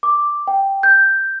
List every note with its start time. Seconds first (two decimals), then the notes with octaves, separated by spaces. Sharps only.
0.03 D6
0.47 G5
0.83 G6